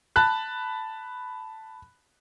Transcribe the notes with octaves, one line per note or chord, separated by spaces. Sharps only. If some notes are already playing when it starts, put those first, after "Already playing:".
A5 B5 F#6